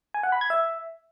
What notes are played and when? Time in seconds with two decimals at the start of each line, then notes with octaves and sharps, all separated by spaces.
0.14 G#5
0.23 F#5
0.32 B5
0.41 G#6
0.50 E5